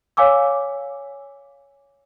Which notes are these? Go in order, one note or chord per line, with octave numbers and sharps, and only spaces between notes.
C#5 F5 G#5 D6 E6